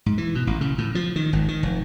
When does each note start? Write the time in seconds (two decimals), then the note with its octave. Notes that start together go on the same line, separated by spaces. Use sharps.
0.06 G#2
0.18 E3
0.35 B2
0.47 A1
0.61 C#3
0.78 A2
0.95 F3
1.16 D#3
1.33 G#1
1.48 D#3
1.63 F1